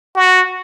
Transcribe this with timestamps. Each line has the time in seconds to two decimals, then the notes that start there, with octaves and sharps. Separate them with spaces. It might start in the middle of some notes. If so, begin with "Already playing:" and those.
0.16 F#4